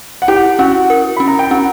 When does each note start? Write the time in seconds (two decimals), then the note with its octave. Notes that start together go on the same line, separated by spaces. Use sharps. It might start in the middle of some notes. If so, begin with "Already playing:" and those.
0.22 F#5
0.28 E4 G4 G5
0.59 C#4 F#4 F#5
0.90 A#4
1.17 C#4 B5
1.28 A#5
1.39 G5
1.51 C#4 F#4 F#5